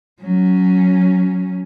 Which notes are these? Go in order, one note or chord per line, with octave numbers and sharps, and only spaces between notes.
F#3 C#4